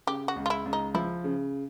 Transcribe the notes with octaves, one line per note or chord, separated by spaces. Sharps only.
C#3 G4
F#4
C#2
F4
E4
C#2
D#4
F3 E4
C#3